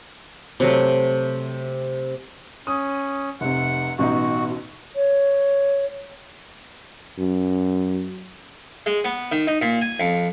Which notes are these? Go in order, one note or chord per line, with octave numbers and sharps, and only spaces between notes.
C3 F#3 A3
C#4 D#6
F1 C3 F#5
A1 B2 D#4 F#4
C#5
F#2
G#3
B3
D#3
D#4
A#2
G#5
F2